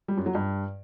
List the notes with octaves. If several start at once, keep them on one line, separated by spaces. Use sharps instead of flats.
G3
F#2
F#3
G2